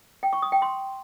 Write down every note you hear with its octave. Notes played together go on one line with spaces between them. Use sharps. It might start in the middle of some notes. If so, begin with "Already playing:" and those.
G5
C#6
D#6
G5
C6